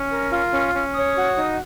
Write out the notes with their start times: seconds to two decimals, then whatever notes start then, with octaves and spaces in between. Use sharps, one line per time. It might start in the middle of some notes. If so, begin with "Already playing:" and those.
Already playing: C#4
0.10 A#4
0.31 F4
0.53 C#4
0.74 C#4
0.95 C#5 D#6
1.17 F#4
1.37 D#4